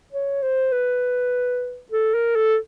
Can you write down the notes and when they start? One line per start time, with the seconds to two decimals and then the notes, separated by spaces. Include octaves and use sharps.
0.13 C#5
0.42 C5
0.72 B4
1.92 A4
2.15 A#4
2.36 A4